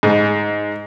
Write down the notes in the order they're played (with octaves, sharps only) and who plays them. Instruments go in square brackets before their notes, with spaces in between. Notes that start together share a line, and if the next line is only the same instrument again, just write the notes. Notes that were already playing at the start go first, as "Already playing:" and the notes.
[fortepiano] G#2